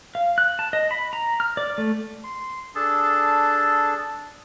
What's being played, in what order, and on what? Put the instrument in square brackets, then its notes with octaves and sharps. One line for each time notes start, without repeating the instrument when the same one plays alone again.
[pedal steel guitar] F5
F#6
A5
D#5
B5
A#5
F6
D5
A3
[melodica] C6
D4 G#4 A4 A5